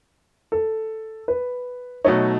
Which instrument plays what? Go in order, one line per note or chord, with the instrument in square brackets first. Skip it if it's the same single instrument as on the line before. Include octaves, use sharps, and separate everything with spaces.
[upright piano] A4
B4
[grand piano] B2 F#3 A3 D#4 [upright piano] C#5